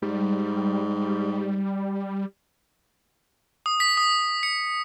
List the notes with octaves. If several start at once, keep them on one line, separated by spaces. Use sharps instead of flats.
G#2 G3
D#6
B6
D#6
C#7